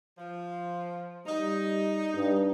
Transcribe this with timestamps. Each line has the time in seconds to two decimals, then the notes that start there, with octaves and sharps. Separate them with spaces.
0.18 F3
1.27 G3 D#4
2.15 G2